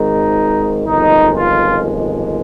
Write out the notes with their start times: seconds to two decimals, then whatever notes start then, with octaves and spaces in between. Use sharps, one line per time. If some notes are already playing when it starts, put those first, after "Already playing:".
Already playing: G#1 G#2 D#3 D#4
0.86 G1 F2 D#3 G#3 D#4
1.36 F4